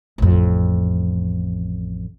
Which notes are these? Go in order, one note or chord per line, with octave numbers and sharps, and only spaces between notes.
A1 F2